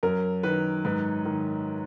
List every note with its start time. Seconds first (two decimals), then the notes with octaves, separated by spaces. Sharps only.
0.03 F#2 A#4
0.43 D#3 B4
0.85 G#2 B4
1.25 D#3